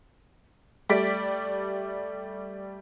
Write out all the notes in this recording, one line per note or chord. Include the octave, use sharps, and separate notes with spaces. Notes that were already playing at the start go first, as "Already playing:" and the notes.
G3 A3 D5 B6 D7